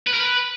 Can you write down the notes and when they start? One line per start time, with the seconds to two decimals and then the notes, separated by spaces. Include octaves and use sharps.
0.07 B4
0.14 A#4
0.20 B4